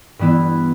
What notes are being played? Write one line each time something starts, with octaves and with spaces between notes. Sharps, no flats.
G2 E3 B3 E4